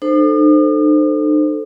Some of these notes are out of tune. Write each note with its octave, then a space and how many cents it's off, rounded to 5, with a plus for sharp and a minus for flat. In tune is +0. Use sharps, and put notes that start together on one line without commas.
D#4 -45 A4 +0 C5 -5